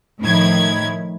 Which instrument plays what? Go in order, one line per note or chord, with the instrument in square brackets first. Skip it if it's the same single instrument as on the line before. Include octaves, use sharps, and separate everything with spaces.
[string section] A2 D#3 F3 E4 G#6